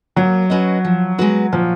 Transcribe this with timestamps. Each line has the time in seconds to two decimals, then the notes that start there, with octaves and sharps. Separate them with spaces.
0.16 F#3 A#3
0.50 C#4 F#4 B4 D#5
0.85 F3
1.18 G#3 B3 F#4 B4
1.53 A#2 F3